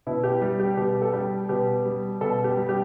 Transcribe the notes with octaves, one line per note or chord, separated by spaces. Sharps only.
B2 E4
G4
G3
G4
B2 G4
A4
G3 G4
B2 G4
G3
B2 A4
G4
G3
G4